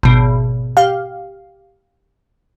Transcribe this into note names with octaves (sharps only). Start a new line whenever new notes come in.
G#1 B2
G4 F5